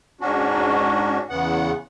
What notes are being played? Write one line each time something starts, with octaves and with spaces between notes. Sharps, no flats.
G#2 C#4 D4 F#4
E2 C#3 B3 F#5